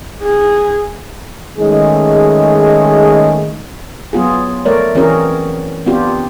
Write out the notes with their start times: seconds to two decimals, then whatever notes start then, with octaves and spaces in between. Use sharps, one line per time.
0.22 G#4
1.58 D#3 G#3 A3 C#4 G#4
4.13 F#3 B3 F4 G#4
4.66 F3 A3 A#4 C#5 D5
4.95 E3 C4 C#4 F#4 G#4 A#4
5.86 B3 C4 D4 F4 G4